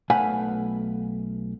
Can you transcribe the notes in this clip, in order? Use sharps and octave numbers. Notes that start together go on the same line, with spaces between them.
B1 A3 B4 F5 F#5 G#5